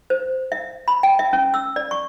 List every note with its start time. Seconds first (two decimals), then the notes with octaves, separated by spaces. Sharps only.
0.10 C5
0.52 E5
0.88 B5
1.03 G5
1.19 E5
1.33 C#4
1.54 E6
1.76 D5
1.91 C#6